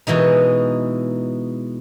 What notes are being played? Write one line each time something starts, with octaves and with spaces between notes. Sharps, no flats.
B2 E3 G#3 D#4